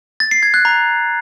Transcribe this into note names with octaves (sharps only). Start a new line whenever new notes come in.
A6
C7
G#6
F#6
A#5